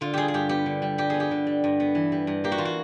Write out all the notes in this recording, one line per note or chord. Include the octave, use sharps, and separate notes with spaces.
D3 F4
G3 G4 G#4
G#4
G2 G4
B3 G4
D3
G3
G2 G4
B3 G#4
G4
D3
G3
G2
B3
E3
G3
G2
A#3 G4
F#4
E3 F4
F#4